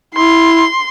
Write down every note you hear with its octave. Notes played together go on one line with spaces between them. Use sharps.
E4 C6